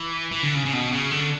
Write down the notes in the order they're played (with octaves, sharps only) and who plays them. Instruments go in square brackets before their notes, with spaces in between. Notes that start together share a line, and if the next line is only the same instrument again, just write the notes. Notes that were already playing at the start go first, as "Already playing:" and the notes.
Already playing: [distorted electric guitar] E3
E3
D3
C#3
C#3
B2
C#3
D3